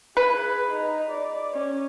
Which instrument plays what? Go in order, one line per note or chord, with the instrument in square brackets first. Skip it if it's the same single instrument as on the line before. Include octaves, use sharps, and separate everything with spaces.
[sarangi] G#4 [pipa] B4
[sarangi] D#4
D5
C#4